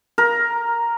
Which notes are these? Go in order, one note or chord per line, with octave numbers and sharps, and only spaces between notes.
A#4